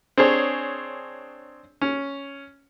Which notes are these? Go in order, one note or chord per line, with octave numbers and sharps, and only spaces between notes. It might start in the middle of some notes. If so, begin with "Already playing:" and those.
C4 D4 G#4 C#5
C#4